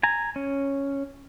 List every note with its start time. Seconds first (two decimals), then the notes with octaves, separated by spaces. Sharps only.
0.03 G#5 A#5
0.36 C#4